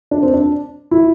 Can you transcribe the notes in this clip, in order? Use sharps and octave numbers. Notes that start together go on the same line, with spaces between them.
D4
C4
D4
E4